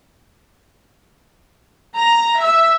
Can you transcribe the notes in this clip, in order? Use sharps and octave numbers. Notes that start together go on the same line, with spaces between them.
A#5
E5